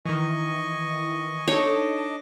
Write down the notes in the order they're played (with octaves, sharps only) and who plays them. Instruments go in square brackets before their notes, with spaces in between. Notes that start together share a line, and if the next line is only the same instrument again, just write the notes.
[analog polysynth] D#3 E3 [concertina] D#5 G#5 C#6
[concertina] D4 D#5 D6 [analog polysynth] D#4 A4 [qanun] C#5